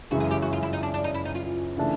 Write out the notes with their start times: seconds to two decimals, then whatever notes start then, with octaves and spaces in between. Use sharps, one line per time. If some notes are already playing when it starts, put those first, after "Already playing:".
0.11 F#2 C#3 E3 G#3 F#4
0.20 G#4
0.31 G4
0.42 F#4
0.53 F4
0.63 E4
0.73 D#4
0.83 D4
0.94 D4
1.04 D#4
1.14 E4
1.25 D#4
1.35 F4
1.77 C#3 E3 A3 D4